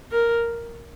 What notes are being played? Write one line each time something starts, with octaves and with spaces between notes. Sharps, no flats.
A#4